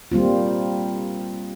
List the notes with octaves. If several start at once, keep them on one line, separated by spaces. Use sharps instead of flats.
G3 A#3 C4 F4